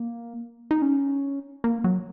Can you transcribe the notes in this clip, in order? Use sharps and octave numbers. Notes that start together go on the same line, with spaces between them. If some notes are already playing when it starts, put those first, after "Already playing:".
Already playing: A#3
D#4
C#4
A#3
F#3